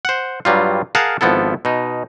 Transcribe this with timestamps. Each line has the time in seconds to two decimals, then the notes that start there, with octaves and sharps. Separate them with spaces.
0.05 C5 F#5
0.45 G2 F#3 G3 F4
0.95 G#4 A#4 F5 F#5 A5
1.21 G#1 F3 B3 E4 A4
1.65 B2 D#4